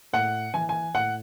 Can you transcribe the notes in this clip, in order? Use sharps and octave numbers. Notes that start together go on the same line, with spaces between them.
A2 F#5
E3 G#5
G#5
A2 F#5